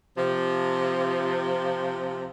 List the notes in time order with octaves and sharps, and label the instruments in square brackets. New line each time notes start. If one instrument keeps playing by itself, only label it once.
[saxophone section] C3 F3